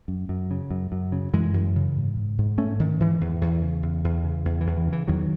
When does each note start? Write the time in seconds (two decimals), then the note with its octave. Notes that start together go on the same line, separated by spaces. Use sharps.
0.08 F#2
0.29 F#2
0.51 C#3
0.71 F#2
0.92 F#2
1.12 C#3
1.33 F#2 E3 G#3
1.54 F#2
1.76 C#3
1.96 G#2
2.16 G#2
2.38 G#2
2.58 G#2 A3 C#4
2.79 G#2 D#3
3.00 G#2 E3
3.21 E2
3.41 E2
3.62 C#3
3.83 E2
4.04 E2
4.24 C#3
4.45 E2
4.61 E3
4.67 E2
4.77 E3
4.88 C#3 E3
5.08 E2 D#3 F#3